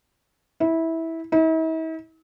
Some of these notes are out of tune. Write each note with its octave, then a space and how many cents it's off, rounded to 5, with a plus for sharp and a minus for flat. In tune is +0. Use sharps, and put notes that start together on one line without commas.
E4 -15
E4 -45